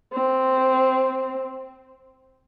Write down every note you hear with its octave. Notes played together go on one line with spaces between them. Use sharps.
C4